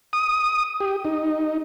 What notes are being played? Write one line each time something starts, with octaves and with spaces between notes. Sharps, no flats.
D#6
G4
D#4